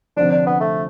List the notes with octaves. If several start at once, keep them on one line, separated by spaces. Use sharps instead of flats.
F1 F2 D3 F3 D4
D4
B3
A3